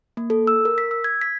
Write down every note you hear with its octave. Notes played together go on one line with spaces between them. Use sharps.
A#3
A4
E6
A#4
B6
E6
G#6
B6